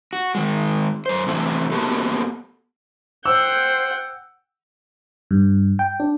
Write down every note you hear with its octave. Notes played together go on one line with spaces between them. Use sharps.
F#4
D#3 G#3
F#2 C5
C3 E3 A3
A#3 B3 F#4 G4 A4
C5 F#5 G5 E6
G2
G5
D4